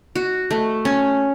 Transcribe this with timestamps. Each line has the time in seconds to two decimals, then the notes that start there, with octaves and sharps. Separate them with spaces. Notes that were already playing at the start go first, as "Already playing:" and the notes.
0.15 F#4
0.51 A3
0.85 C#4